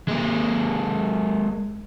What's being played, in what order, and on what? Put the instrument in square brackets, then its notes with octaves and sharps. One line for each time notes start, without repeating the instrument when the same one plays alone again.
[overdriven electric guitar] G#3 A#3